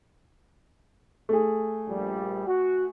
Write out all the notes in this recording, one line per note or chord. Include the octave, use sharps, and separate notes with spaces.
A3 G#4
A#1 G3
F#4